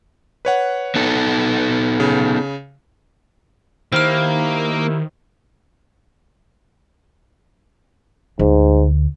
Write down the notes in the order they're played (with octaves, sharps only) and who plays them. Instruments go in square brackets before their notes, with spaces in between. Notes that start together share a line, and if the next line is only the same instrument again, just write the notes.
[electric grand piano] B4 C#5 F#5
[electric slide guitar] B3 D#4 A4
[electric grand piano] C#3
[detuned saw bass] D#3 [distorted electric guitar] A#3 [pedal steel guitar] E4 G4 F5 [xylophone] C5 F6
[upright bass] D2 [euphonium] G#2